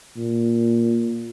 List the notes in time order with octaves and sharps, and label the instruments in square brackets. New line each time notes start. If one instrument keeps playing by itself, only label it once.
[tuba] A#2